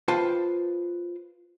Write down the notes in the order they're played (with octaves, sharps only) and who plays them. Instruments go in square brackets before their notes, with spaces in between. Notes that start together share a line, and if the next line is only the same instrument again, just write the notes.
[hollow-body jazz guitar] F4 B4 C5 G5 A5